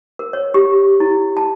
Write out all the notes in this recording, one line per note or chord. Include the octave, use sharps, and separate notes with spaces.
A#4
C#5
G4
E4
A5